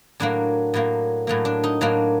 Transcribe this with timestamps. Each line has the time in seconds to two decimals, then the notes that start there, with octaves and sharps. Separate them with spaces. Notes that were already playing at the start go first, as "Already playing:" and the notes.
0.20 A2 F#3 A#3 D4
0.74 A2 F#3 A#3
1.27 A2 F#3 A#3
1.45 D4
1.64 D#4
1.81 A2 F#3 A#3 D4